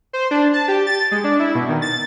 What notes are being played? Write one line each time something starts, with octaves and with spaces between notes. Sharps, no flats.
C5
D4
A5
G4
A6
G#3
D4
E4
B2
D#3
A6